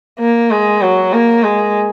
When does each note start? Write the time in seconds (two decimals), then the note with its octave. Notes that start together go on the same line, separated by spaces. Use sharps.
0.19 A#3
0.51 G#3
0.82 F#3
1.13 A#3
1.43 G#3